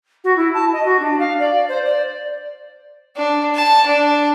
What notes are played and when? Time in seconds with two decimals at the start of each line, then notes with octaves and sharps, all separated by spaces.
0.24 F#4
0.37 E4
0.54 A5
0.73 D#5
0.85 F#4
1.00 D4
1.20 F5
1.39 D5
1.69 C5
1.85 D5
3.16 D4
3.55 A5
3.86 D4